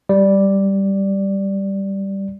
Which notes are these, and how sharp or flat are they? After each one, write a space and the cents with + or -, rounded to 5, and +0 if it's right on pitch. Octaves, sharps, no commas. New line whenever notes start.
G3 +0 D5 +0